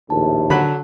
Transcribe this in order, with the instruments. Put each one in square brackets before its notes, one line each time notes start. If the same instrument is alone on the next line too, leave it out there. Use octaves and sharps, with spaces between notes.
[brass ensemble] A#1 D#2 A2 [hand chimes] A5
[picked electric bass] D3 [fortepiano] F#3 F#4 B5